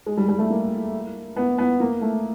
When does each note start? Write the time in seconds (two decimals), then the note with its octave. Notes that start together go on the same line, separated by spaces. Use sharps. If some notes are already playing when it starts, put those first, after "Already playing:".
0.06 G#3
0.17 G3
0.28 G3
0.39 A3
0.50 A#3
1.36 B3
1.58 B3
1.80 A#3
2.01 A3